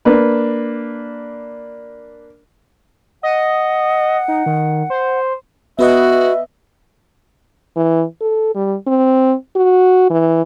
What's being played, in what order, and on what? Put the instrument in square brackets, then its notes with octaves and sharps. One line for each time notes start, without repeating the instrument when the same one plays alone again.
[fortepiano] A#3 D4 B4
[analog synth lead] D#5 [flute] F#5
[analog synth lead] D#4
D#3
C5
[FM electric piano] B3 B4 D#5 [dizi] F#4 [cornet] E5
[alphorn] E3
A4
G3
C4
F#4
E3